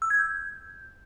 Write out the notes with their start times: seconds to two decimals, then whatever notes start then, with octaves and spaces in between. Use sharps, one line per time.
0.02 E6
0.10 G#6
0.19 G6